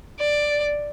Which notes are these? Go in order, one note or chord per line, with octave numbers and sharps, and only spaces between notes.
D5